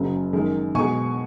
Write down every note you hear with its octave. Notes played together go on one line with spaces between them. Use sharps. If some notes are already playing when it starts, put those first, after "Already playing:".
Already playing: F#1 F#2 C#3 F#3
F#2 D#3 G#3
B1 B2 G#3 G#5 C#6